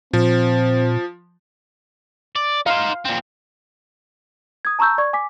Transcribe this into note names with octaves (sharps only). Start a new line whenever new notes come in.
A#2 F3 C4
D5
D#4 C5 F5
A#2 C4
D#6 G#6
A5 A#5 C#6 E6 G6
D5 C#6 G#6
G#5 D6 B6